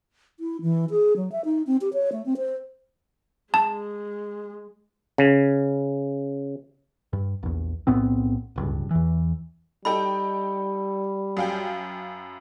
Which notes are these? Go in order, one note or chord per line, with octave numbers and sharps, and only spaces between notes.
E4
E3
G#4
F#3
E5
D#4
C4
G4
C#5
A3
C4
C5
G#3 A5
C#3
G2
A#1 E2
B1 A2 B3 C4
D1 C#2 G2
E2 E3
G3 D#4 A4 G5 B5
F#2 F5 G5